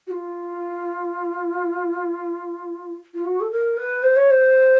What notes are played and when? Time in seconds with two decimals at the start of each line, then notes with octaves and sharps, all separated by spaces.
0.07 F#4
0.11 F4
3.14 F4
3.25 F#4
3.40 A4
3.51 A#4
3.77 B4
4.03 C5
4.16 C#5
4.30 C5